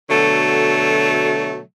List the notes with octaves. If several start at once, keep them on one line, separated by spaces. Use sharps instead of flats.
B2 D3 F#3 A3